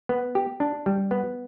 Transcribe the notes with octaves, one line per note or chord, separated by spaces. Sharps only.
B3
G4
D4
G3
B3